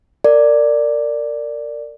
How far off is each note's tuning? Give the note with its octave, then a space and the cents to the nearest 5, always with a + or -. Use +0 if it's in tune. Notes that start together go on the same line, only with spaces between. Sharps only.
A#4 -25 D5 +0